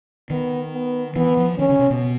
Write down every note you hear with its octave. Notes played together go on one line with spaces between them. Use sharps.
D#3 B3
B3
E3 B3
F3
D#3 C#4
C#3
C3
B2